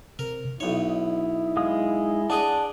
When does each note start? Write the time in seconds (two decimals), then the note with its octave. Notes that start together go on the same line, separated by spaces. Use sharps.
0.19 C3 A#4
0.60 B1 D#4 E4 C#5
1.57 G#3 F5 D#6
2.30 D4 G#4 D5 D#5 F#5 A5